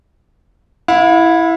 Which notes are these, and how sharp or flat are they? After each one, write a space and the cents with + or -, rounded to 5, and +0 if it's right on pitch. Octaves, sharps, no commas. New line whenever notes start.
E4 +0 F5 +45